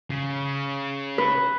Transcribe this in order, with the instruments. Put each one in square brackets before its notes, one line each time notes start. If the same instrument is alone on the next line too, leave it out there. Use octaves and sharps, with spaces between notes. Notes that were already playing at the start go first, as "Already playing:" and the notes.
[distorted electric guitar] C#3
[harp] B4